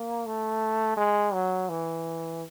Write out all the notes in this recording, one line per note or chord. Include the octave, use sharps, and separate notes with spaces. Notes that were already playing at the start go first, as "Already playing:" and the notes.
Already playing: A#3
A3
G#3
F#3
E3